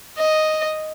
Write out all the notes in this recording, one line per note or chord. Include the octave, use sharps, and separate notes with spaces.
D#5